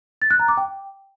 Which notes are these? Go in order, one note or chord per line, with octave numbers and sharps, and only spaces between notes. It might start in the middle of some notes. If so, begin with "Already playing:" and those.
A6
F#6
A#5
D6
G5